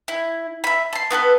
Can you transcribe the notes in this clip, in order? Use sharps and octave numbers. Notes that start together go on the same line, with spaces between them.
E4
E5 B5
A5 C6
B3 F#4 A4 B4